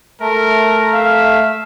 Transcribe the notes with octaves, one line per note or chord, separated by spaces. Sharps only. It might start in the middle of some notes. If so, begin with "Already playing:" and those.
A3 A#4
E5 F5